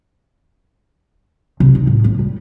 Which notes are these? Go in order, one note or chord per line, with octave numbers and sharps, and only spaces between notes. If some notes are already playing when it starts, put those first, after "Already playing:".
C3
D#4
A2
C#2
G3